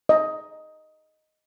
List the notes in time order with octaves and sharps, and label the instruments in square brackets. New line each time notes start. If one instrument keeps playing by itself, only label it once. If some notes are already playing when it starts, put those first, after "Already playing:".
[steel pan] D#5